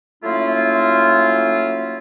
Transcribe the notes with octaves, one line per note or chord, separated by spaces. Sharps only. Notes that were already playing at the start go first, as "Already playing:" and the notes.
F#3 A3 A#3 C#4 E4 F4